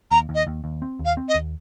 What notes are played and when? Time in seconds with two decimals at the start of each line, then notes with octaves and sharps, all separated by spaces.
0.11 D#2 A#5
0.29 D#2
0.35 D#5
0.47 D#2
0.64 D#2
0.82 C4
0.99 D#2
1.05 F5
1.17 C4
1.29 D#5
1.35 D#2